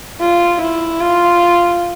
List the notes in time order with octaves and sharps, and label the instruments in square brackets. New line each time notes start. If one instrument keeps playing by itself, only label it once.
[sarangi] F4
E4
F4